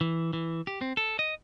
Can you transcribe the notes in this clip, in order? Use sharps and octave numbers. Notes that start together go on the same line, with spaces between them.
E3
E3
G4
C4
A4
D#5